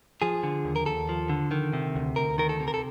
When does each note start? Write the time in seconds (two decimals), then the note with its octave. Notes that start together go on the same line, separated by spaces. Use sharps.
0.22 F3 G#4
0.43 D3
0.65 D#2
0.76 A#4
0.86 D#2 A4
1.09 F3
1.29 D3
1.51 D#3
1.73 C3
1.96 D2
2.16 D2 A#4
2.38 D#3 A#4
2.49 A4
2.60 C3
2.68 A#4
2.74 A4